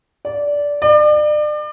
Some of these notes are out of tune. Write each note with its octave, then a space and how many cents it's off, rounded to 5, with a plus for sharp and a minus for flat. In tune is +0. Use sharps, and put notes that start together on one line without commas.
D5 -15
D5 +35